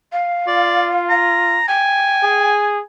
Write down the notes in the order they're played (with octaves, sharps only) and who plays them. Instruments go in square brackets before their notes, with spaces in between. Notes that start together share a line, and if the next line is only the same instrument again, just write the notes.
[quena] F5
[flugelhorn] F4 [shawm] D5
[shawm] A#5
[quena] G5 [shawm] G#5
[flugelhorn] G#4